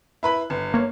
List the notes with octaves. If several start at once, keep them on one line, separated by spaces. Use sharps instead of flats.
E4 B4 B5
G1
A#3 C#5